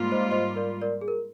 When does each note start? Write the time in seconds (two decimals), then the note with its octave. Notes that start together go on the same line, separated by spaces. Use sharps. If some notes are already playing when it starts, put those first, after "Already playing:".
Already playing: G#2 G3 A#3 F4
0.12 C5 D#5
0.31 C5 D#5
0.56 A#4 D5
0.81 A#4 D5
1.01 G#4
1.08 A#4